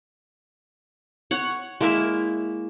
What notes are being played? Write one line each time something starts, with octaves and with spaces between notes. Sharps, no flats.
C#5 F#5
G#3 A#3 E4 E5